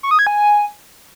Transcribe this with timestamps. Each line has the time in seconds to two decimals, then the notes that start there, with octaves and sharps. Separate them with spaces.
0.03 C#6
0.11 D#6
0.19 G#6
0.27 G#5